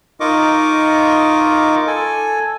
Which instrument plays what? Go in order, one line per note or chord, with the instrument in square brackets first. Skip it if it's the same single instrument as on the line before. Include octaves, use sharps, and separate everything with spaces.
[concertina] D#4 F4 A#4 D#5 C#6 D6
A4 G#5